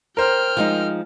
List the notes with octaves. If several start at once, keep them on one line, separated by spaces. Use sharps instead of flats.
A#4 C5 G5 F6
F3 G#3 D#4